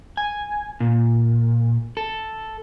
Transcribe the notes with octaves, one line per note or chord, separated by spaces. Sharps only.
G#5
A#2
A4